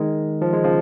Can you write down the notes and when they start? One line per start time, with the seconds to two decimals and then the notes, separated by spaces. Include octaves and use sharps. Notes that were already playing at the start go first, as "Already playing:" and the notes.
Already playing: D#3 G#3
0.41 F3
0.53 G#3
0.65 C#3 F3